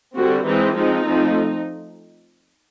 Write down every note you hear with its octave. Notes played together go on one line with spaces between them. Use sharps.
D3 G3 C4 F#4
E3 G#3 C4 D#4
F3 G#3 C4 D#4
F3 A3 C4